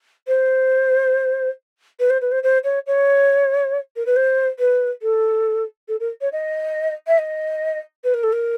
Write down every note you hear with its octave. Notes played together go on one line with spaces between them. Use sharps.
C5
B4
C5
B4
C5
C5
C#5
C#5
A#4
B4
C5
B4
A4
A4
A#4
C#5
D#5
E5
D#5
B4
A#4
A4
A#4